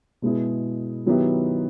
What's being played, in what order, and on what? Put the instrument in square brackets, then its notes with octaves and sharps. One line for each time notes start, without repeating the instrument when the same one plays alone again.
[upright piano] B2 G#3 B3 E4 G#4
D#3 F#3 B3 E4 G4